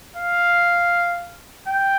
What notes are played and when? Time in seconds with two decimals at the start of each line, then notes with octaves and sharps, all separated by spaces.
0.16 F5
1.68 G5